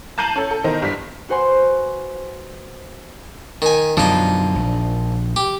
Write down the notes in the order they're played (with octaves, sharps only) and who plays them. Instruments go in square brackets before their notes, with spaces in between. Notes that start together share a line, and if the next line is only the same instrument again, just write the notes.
[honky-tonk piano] A5 A#5 G6 C7 D#7 F#7
C#4 A4
A4
B2 D#3 C5 D#5 A#5
G2 B6
[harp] F#4 B4 C5 F#5 G#5 C6
[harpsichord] D#3 G#5
[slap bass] F#2 B2 D3 [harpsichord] F3 D#4
[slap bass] A#1
[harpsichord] G4